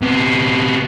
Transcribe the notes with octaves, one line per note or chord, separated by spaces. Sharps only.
C3 B3